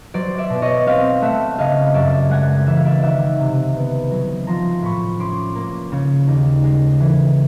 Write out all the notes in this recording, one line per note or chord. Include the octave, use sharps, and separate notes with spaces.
F#3 C5 D5
D5 E5
B2
C#5 D#5
C4 D#5 F5
A3 E5 F#5
C#3 D#5 F5
F#2 D5 E5
G#3 F#5 G#5
E3 E5
F5
D5 E5
D#3 E5 F#5
C3
B3
F#3
F3 A#5 C6
A2 B5 C#6
C#4 C6 D6
A#3
C#3
D#2
G#3
E3